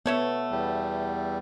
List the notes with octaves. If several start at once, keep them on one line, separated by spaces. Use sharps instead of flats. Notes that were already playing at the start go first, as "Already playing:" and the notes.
A3 B3 C#5 E5
E2 G3